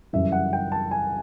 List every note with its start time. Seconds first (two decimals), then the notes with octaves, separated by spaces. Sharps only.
0.13 F#2 C#3 E3 G3 E5
0.32 F#5
0.53 G5
0.72 A5
0.91 G#5